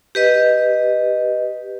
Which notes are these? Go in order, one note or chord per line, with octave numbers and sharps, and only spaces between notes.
G4 B4 D#5